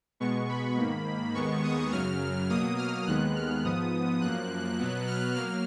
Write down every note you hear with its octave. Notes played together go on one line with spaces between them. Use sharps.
B2 G#3 B3 C#6
B5
G#2 D#3 A#3
D#2 D#3 G#3 B3 C#6
D#6
F#2 C#3 F#3 F6
B2 F#3 A#3 D#6
F6
D#2 D#3 G#3 B3 F#6
F6
G#2 F3 B3 D#6
F#2 F3 A#3 F#6
B2 F#3 B3
F6
F#3 A#3 F6